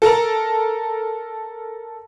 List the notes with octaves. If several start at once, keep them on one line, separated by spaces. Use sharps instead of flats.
A4 A#4 A5 A#5